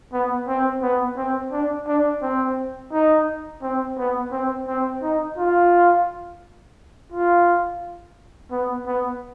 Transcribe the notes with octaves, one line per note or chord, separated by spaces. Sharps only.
B3
C4
B3
C4
D4
D4
C4
D#4
C4
B3
C4
C4
D#4
F4
F4
B3
B3